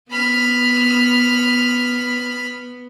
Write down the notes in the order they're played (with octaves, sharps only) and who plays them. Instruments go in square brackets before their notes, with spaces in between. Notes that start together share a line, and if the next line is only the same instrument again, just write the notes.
[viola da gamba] B3 [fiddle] B5 F6